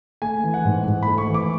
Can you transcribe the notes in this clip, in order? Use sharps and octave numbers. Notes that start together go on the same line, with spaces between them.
A3 G#5
E3
F#5
G#2
G#2
A3 B5
C#6
E3
D6